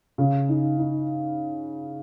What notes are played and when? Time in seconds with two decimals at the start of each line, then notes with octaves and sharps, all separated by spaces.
0.18 C#3
0.49 D#4
0.78 D#4